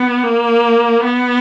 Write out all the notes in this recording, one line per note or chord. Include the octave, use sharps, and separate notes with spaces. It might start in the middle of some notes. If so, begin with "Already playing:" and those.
Already playing: B3
A#3
B3